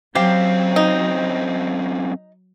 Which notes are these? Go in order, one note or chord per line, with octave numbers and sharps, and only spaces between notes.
F#2 F#3 C4 G4 C5 F5
D#4